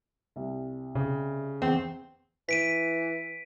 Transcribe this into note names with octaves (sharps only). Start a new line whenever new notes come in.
C2
C#3
E2 C4
E3 B6 D7 D#7